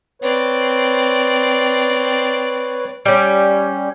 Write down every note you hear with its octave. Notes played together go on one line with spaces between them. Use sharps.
C4 B4 C#5 D5
G3 C#4